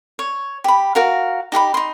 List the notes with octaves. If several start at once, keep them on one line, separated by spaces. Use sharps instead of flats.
C#5
G4 B5
F#4 A#4 F5
D#4 G4 F#5 B5
D#4 C6